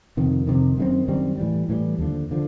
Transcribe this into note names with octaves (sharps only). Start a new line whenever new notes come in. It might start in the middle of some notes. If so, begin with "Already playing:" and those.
F2 C3 D#3
F2 C3 D#3
F#2 D#3 G3 C4
F#2 D#3 G3 C4
A2 E3 G3
A2 E3 G3
D#2 D3 F3
D3 F3